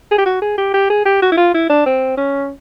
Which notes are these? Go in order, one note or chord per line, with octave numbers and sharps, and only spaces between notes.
G#4
G4
F#4
G#4
G4
G4
G#4
G4
F#4
E4
F4
E4
D4
C4
C#4